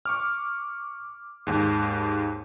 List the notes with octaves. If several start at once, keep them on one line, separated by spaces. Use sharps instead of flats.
C#6 D6 F6
D#2 G#2